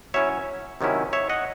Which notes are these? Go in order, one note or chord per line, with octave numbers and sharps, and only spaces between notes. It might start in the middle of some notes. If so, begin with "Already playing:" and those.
F#3 C#4 E4 C#5 E5
C3 D#3 F#3 C#4 E4
C#5 E5
D#5 F#5